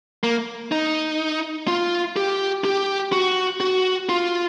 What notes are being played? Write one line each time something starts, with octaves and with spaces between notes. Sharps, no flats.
A#3
D#4
F4
G4
G4
F#4
F#4
F4